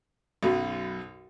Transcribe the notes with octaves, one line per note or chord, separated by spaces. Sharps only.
B1 F#2 B2